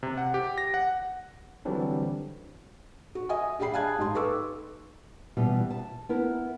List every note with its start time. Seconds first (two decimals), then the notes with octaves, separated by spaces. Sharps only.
0.03 C3
0.18 F#5
0.34 G4
0.58 A#6
0.74 F#5
1.65 D3 E3 F#3 G3 C4 D4
3.15 F#4
3.29 D#5 E5 G#5 D#6
3.59 D4 G4 G#4 G5 B5 C7
3.73 F5 G#5 A5 F#6 G#6
3.98 G#2 D#4 G4 C6
4.15 A4 B4 C#6 D6 E6
5.37 B2 E3 G3
5.70 A5
6.09 B3 E4 A#4